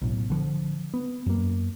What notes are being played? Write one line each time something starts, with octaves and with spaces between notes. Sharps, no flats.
B1 A2
D3 E3 F3
B3
F#2 A#3